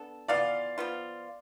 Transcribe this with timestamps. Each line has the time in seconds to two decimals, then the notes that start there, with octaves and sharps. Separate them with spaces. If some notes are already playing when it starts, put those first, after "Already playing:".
Already playing: B3 D4 A4
0.28 E3 B3 F4 D5 F5
0.78 F3 B3 F4